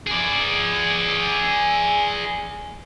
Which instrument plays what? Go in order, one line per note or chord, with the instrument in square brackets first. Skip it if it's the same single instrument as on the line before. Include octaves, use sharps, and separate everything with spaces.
[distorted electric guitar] G#4 D5